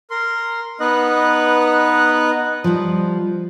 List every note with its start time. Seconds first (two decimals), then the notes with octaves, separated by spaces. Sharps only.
0.11 A#4 C6
0.80 B3 D#4 B4 D#5 F#6
2.64 F3 G3